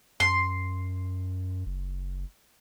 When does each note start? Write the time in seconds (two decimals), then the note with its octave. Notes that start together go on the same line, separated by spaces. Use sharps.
0.20 F#2 C6
1.66 F#1